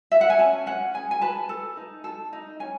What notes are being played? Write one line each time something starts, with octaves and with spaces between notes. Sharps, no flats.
E5
F#5
G#5
C#4 A5
C#4 F#5
G#4 G#5
G#5
B4 A5
A4
D#4
A4
D#4
C#4 G#5